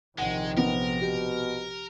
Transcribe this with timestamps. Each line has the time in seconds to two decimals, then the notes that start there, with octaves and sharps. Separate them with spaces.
0.18 A#1 C3 D#3 G#3 F#5
0.57 B3 A#4
1.01 B2 G4